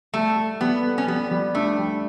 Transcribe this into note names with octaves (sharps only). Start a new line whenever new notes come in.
G3 A3
A4
G3 B3
A4
C#4
G3 B3
G3
A3 D4
G3